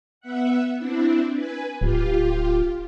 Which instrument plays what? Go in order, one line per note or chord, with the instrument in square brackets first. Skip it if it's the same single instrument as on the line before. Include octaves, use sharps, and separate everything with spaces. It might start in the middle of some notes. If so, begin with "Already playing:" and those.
[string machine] B3 E5 F#5
C4 D4 E4
B4 G#5
[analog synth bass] D1 [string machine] F4 G4